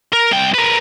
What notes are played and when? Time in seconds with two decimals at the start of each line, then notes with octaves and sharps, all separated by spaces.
0.13 A#4
0.31 C2 G5
0.54 A#4 B4